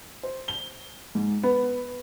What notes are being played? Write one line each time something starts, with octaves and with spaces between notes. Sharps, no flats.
C5
G7
G#2
B3